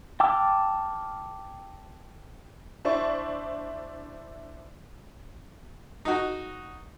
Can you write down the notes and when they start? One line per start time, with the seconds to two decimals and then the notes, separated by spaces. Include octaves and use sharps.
0.20 G5 A5 D6 E6 F6
2.85 D4 E4 C5 D5 C#6
6.05 D#4 F#4